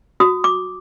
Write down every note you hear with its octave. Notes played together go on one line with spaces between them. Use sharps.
F#4 D#6
D6